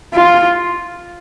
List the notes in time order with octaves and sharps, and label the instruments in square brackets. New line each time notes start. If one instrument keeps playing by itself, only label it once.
[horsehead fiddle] F4